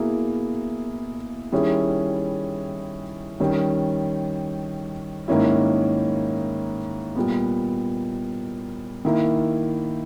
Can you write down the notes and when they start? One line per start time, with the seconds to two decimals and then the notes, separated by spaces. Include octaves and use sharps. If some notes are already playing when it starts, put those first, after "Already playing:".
Already playing: B2 A#3 E4 G#4
1.52 D#3 G3 C#4 E4 G#4
3.40 D#3 G3 C#4
5.28 G#2 D#3 A#3 C#4 E4
7.15 A#2 G3 B3
9.05 D#3 A#3 E4